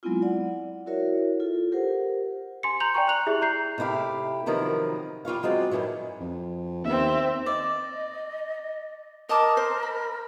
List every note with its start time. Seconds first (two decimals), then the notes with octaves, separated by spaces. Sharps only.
0.03 F#3 G#3 B3 C4 E4 F4
0.22 D5 F#5
0.86 E4 F#4 A#4 C#5 E5
1.40 F4 A4
1.72 G4 A#4 C5 F#5
2.63 G#5 C6 C#7
2.80 A#5 C6 G6 F7 F#7
2.94 D5 G5 G#5 A#5 C#6
3.07 A#5 F#6 F7 F#7
3.27 E4 G4 G#4 E5
3.42 A#5 G6 C7
3.78 C3 A3 E4 G4 F5
4.46 C3 D#3 F3 F#3 A#4 B4
5.25 G3 F4 C#5 F5
5.43 F#3 G#3 C4 F4 D5
5.71 G2 B2 D#3 E3 F#3
6.20 F2
6.85 D#2 C4 E5
7.46 D5 D#5
9.29 A#4 D#5 A5 D6
9.57 C5
9.83 B5